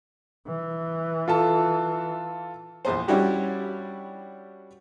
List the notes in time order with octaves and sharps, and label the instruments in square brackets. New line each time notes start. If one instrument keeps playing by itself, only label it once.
[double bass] E3
[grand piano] F4 A4 A5
[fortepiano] A#1 E2 C5
G3 C#4 D4 E4 F#4 G4